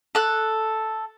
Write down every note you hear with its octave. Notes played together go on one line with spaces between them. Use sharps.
A4 F#6